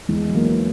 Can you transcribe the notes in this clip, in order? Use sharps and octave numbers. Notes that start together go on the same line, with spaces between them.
E2 G#3
F#3
E3 A#3